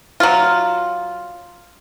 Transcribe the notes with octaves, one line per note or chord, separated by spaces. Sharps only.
F#3 F4